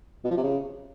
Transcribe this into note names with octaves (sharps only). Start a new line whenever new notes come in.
B2
F3
C3
C#3